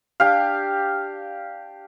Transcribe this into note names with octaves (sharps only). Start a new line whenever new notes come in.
D4 G4 F5